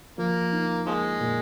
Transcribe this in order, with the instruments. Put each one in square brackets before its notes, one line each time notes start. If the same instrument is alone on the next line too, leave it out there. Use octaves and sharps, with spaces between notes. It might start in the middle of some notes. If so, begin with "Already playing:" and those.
[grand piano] F3 [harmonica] A#3
[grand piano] D#4
[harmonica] F3 G#3 [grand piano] A#3
[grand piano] A#2